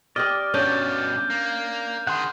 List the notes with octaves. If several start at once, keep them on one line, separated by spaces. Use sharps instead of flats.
C4 G4 D5 D#5 F6 D#7
G2 B2 C#4 D4 F6 G6
A#3
D#3 G#4 F#5 C6